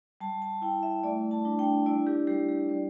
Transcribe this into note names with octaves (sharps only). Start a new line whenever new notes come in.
G3 A5
A5
E4 G5
E5
A3 D5
A5
D4
G5
E4 D5
G4
G3 G4
G4
G3